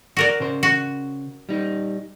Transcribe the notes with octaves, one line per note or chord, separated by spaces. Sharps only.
F#4 A#4 D5
C#3 C5
F#4
G3 D#4